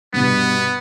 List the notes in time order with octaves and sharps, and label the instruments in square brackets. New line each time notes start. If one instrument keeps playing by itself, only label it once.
[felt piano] G2 B2 [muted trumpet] B3